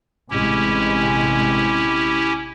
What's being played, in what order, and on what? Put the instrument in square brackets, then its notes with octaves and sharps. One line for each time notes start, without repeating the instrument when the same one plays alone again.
[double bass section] A1 C3 G#3 [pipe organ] C#4 E4 G4